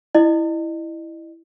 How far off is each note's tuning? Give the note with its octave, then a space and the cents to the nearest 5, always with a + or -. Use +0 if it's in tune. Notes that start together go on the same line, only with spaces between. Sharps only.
E4 +0 D#5 -35